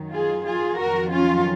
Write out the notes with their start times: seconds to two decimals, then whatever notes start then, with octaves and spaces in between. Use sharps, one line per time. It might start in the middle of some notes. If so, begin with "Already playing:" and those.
Already playing: F#2 D#3 F#3
0.11 F4 G#4
0.44 F4 G#4
0.78 F2 D#3 F#3 F#4 A#4
1.11 C#4 F4